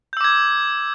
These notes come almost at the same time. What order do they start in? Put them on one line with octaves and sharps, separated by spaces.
G6 E6 D6 G#6